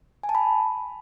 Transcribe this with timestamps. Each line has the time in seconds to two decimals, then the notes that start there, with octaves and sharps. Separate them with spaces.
0.23 G#5
0.29 A5
0.35 B5